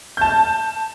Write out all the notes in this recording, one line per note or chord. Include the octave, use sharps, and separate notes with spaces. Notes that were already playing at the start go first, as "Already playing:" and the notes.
A5 G6